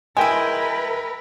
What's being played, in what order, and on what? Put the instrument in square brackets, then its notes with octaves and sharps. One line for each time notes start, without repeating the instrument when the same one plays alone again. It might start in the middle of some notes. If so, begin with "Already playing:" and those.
[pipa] G#3 E4 [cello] A#4 B4 [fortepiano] G5 G#5